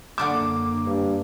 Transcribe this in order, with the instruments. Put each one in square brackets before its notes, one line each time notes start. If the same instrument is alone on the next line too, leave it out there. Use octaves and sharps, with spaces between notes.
[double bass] F#2 A#3 [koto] D3 D4 E5 [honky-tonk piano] D6
[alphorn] G2